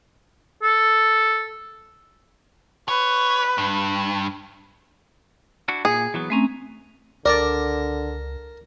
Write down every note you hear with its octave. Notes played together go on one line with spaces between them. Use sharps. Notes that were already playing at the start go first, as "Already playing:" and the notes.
A4
B4 C#5
G2
D4 E4 F#4
A#2 G#4
E3 F#3 B3
A3 C4 C#4 E5 G#5 A#5
C#2 D3 A#4 D5 A5 A#5